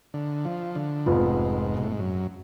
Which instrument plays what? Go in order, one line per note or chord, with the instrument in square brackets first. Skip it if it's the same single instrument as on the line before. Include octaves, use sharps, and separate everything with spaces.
[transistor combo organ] D3
F3
D3
[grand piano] F1 F2 F3 B3 F4 [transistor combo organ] G#2
[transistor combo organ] B2
A2
G#2
F#2